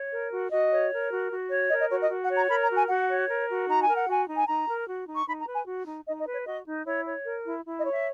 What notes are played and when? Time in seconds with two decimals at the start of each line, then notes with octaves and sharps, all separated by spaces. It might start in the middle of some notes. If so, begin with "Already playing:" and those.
Already playing: C#5
0.11 A#4
0.31 F#4
0.50 F#4 D#5
0.70 C#5
0.90 A#4
1.10 F#4
1.30 F#4
1.49 C#5
1.69 A#4 D#5
1.79 D#5
1.89 F#4 C#5
2.00 D#5
2.09 F#4
2.23 F#5
2.29 C#5
2.35 A#5
2.49 A#4 B5
2.62 A#5
2.68 F#4
2.75 G#5
2.88 F#4 F#5
3.08 C#5
3.28 A#4
3.48 F#4
3.68 D#4 A#5
3.81 G#5
3.88 A#4
3.95 F#5
4.07 F#4 G#5
4.27 D#4
4.36 G#5
4.47 D#4 A#5
4.67 A#4
4.87 F#4
5.06 D#4
5.15 C#6
5.27 D#4 B5
5.39 A#5
5.46 B4
5.53 G#5
5.66 F#4
5.86 D#4
6.05 D#4 D#5
6.19 D#5
6.25 B4
6.32 C#5
6.45 F#4 D#5
6.65 D#4
6.85 E4 C#5
7.05 C#5
7.25 A#4
7.44 E4
7.64 E4
7.78 D#5
7.84 C#5
7.90 E5